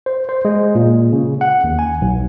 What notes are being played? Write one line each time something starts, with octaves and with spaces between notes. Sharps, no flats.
C5
C5
G#3
A#2
C#3
F#5
D#2
G#5
B1